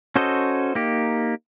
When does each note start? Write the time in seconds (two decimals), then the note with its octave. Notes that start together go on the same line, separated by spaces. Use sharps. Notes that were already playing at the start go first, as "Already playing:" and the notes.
0.16 C#4 F#4 A4 C5 D#5
0.75 A#3 D#4 G4